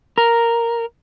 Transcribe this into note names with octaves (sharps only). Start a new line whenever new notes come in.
A#4